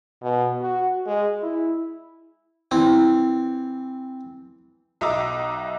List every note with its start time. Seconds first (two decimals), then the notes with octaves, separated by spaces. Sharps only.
0.23 B2
0.61 F#4
1.06 G#3
1.42 E4
2.71 E3 C4
5.01 B1 D#5 E5 A#5 D6 E6